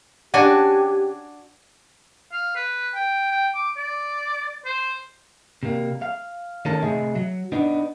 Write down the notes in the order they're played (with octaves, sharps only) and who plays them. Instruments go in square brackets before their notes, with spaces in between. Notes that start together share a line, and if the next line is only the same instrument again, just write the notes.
[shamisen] C#3 D5 F#5 [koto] D4 F#4 G#5 [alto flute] G4
[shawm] F5
B4
G5
G5
D6
D5
C5
[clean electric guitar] C3 A#3
F5
D#3 A3 C#4 D#4 A4 A#4
C3 A3 G#4 D#5 E5 G#5
F#3
B3 D4 D#4